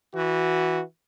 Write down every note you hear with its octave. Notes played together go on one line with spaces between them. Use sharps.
E3 F#4